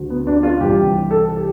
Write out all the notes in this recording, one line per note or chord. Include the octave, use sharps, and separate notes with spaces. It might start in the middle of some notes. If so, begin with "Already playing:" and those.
Already playing: D2 D3
B3
D4
F4
C2 C3 E3 G4
A4
G4